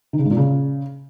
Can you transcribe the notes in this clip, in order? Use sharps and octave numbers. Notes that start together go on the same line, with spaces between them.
D#3
C#3
G#2
A#2
C#3